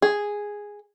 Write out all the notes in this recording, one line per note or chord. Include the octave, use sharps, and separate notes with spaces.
G#4